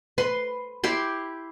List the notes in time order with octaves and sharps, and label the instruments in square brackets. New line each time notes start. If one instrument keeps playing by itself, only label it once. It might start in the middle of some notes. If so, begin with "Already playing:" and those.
[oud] B4 [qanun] C6
[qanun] E4 G4 C6